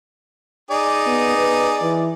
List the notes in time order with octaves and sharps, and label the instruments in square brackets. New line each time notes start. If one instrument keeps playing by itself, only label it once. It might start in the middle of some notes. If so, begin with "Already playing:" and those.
[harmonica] D#4 G#4 D5
[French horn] B3
B4
E3